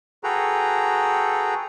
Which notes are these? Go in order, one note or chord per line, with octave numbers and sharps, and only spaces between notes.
F#4 G#4 A4 B4 G5 A#5